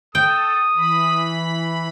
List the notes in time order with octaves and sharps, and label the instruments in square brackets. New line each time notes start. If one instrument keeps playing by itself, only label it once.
[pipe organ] A4 [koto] G5 [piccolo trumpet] D#6
[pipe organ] E3 B5